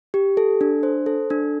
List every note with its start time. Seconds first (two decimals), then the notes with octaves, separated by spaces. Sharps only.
0.14 G4
0.37 A4
0.61 D4
0.83 C5
1.06 A4
1.30 D4